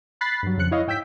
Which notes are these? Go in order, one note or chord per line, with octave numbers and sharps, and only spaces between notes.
B5 F#6 A6 B6 C7
G2 F#3
F2 C#3 F3 F#6 C#7
E4 C#5 D#5 F5
G#2 G5 E6 G6 B6